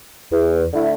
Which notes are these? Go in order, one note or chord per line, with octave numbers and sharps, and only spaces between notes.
E2
D3 A3 E4